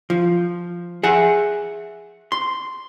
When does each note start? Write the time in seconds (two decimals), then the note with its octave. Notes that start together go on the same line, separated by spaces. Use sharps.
0.10 F3
1.03 G#4 E5 F#5
2.32 C6